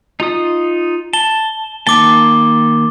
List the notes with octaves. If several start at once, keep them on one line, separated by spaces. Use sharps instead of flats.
D#4 F4 D#6
A5 G7
D#3 A#3 A5 D6 G7